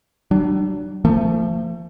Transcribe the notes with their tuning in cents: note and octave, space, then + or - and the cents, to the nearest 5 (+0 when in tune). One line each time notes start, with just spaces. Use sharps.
G3 -45 D4 +25
F3 -20 A3 +35